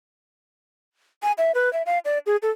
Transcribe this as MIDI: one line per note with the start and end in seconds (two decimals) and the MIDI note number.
1.23 1.32 80
1.38 1.52 76
1.55 1.72 71
1.73 1.82 76
1.86 1.99 77
2.05 2.19 74
2.26 2.37 68
2.42 2.51 69